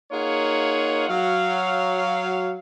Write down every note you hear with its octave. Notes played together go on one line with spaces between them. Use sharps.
A#3 D#4 F4 G#4 C#5 F#5
F#3 F5